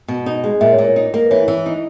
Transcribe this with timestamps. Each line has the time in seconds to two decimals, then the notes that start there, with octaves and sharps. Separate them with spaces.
0.08 B2
0.26 D#4
0.44 G#3
0.61 A#2 E5
0.72 C#5
0.78 A#2
0.84 C#5
0.96 D#4 C#5
1.14 A#3 D#5
1.25 B4
1.30 E3 C#5
1.48 E3
1.66 D#4